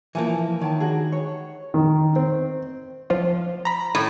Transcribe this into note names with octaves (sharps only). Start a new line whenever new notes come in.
E3 F3 A#3 G#5 A5
D#3 C#5 G5 A5
D4 F#4 G#4
C#5
D#3
C4
F3 F4
A#5 B5
A2 D#6